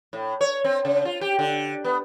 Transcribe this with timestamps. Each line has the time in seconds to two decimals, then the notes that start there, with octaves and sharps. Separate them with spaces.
0.13 A2
0.41 C#5
0.64 C4
0.85 C#3
1.05 F4
1.21 G4
1.39 D3
1.84 B3